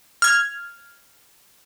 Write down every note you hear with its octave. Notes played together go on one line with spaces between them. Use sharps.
F6 G#6